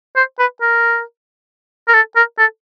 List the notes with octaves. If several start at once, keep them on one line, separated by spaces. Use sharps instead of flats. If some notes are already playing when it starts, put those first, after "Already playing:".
C5
B4
A#4
A#4
A4
A#4
A4